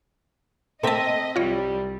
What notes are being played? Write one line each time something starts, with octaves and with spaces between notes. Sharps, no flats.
A3 A#3 C4 D#5 E5 A5
C2 G3 F4 C#5